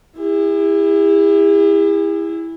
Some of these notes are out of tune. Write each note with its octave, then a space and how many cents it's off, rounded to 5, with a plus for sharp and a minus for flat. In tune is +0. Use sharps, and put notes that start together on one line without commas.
E4 +0 G#4 -45